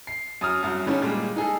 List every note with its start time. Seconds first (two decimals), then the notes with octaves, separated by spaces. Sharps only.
0.07 C7
0.41 F#2 D#6 F6
0.63 C2 F#2
0.86 D3 G3 C#4 D#4
1.02 A#2 G3 G#3
1.36 D#4 G#4 A4